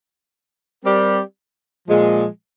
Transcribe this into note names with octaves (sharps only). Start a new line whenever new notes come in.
G3 C4 G4 A#4 D5
A#2 F3 G#3